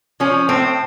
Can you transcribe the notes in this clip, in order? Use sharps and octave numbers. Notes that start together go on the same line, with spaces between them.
F3 C#4
A2 C4